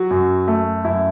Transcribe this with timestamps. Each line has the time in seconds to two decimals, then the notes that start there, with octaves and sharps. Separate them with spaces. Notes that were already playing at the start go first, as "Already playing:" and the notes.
Already playing: F#3 F#4
0.11 F#2
0.48 A3
0.84 F#2 E4